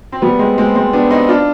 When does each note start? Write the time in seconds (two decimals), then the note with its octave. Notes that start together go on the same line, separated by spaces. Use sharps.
0.12 C4
0.22 G3 B3
0.39 G#3 C4
0.58 G#3 C4
0.75 G#3 C4
0.93 B3 D4
1.10 C4 D#4
1.29 D4 F4